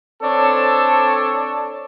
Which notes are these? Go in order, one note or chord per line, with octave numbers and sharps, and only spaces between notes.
C4 D4 A4 C#5